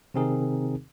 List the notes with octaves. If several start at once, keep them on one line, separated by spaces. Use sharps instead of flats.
C3 D#3 C4 D#4 G#4 A#4